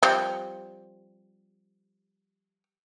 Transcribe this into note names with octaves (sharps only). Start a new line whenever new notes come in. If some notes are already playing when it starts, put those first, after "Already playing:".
F3 G3 C4